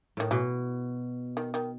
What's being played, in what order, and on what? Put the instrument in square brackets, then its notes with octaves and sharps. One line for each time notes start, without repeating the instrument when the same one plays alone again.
[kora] A2 [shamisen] D#3
[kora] B2 [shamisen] E3
[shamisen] D#3
D#3